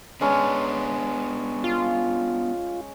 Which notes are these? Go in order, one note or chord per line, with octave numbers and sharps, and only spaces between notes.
G#3 B3 C#4 D4 A#5
F4